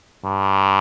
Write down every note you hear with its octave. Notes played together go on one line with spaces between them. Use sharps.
G2